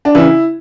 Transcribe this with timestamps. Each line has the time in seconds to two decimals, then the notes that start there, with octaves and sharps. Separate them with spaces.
0.05 D4
0.15 C#3 E3 E4